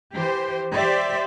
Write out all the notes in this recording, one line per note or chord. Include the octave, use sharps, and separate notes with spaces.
E3 G4 C5
G4 C5 D5 E5